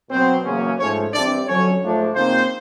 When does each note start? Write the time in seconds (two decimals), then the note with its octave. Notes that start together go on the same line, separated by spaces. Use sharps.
0.10 B2 F#3 B3 C4 C5
0.45 E2 C#3 F#3 A#3 C#4
0.78 G#2 F3 A3 C#4 C#5
1.13 G2 E3 G3 C4 D4 D5
1.46 F2 D3 F#3 C#4 C#5
1.80 G#2 F3 A3 D4
2.15 C#3 F3 A#3 C4 D#4 C5